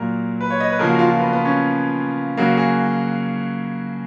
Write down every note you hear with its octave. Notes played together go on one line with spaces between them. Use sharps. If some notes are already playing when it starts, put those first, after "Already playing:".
Already playing: A#2 F#3 A#3 A#4
B4
C#5
D#5
B4
C#3 F3 A#3 A#4
F#4
F4
F4
B3
B3
C#4
C#3 F#3 A#3 F#4
G#4